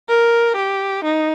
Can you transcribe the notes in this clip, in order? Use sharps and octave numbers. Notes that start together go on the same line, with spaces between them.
A#4
G4
D#4